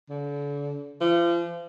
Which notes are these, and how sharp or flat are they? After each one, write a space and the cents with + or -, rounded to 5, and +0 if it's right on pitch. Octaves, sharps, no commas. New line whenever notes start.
D3 -40
F3 -35